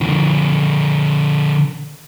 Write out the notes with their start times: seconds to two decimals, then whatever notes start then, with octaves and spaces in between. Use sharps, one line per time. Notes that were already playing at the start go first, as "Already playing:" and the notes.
0.01 D3 F3